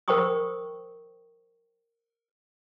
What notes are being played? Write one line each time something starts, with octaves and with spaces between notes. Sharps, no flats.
A#4 C5 G5 B5 C#6 D#6